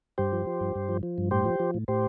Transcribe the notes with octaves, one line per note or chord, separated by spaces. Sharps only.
G2 G4 C5
F3
F3
G2
G2
F3
F3
G2
A2 G4 C5
F3
F3
A2
A2 G4 C5